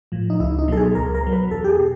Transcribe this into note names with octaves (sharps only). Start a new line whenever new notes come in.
A2 F3
D#4
C#2 E4
D#4
B2 F#3 A4
G#4
C#2 A#4
A#4
B2 F#3
B4
E2 A4
G4
G#4
B2